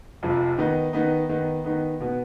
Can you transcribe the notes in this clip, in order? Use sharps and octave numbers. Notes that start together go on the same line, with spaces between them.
F1 F2 C3 F3
D#3 B3 D#4
D#3 B3 D#4
D#3 B3 D#4
D#3 B3 D#4
B2 B3